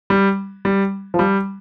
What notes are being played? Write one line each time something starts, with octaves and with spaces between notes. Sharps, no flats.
G3
G3
F3
G3